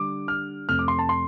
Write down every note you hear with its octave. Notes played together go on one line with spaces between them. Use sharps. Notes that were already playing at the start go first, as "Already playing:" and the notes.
Already playing: D3 G3 D4 D6
F6
F2 C3 A3 F6
D6
C6
A5
C6